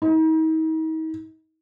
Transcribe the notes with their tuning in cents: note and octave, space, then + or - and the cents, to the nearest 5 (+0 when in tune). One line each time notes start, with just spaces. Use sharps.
D#4 +40